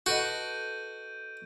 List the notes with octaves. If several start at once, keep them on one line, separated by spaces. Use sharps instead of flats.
F#4 A4 B4 D#5 G6 D7 D#7